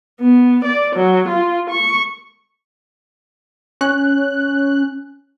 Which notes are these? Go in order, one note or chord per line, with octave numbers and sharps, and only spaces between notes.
B3
D5
F#3
F4
C#6
C#4 F#6